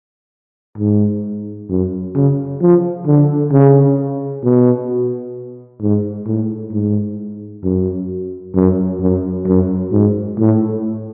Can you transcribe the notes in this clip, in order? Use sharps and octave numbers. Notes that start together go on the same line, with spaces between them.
G#2
F#2
C#3
F3
D3
C#3
B2
G#2
A2
G#2
F#2
F#2
F#2
F#2
G#2
A2